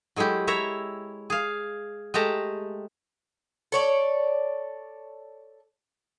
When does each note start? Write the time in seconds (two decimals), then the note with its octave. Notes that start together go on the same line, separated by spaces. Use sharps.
0.16 F#3 G#3 A3 E4 G4
0.47 E4 C#5 E5 A#5
1.30 G#4 F5
2.14 G#3 A3 G4 A5 A#5
3.72 A4 C#5 D5